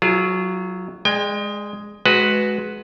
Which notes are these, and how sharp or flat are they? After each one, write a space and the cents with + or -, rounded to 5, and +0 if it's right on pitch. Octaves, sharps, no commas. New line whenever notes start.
F#3 +0 F4 -30 G#4 +40
G#3 +0 D5 +35 G5 +35
G#3 +25 F#4 +0 B4 +0